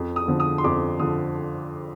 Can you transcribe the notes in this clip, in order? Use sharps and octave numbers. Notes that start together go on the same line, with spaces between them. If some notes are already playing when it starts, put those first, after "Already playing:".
Already playing: F2
D#6
D3 F3
D#6
C6
F2 D6
D3 F3 D#6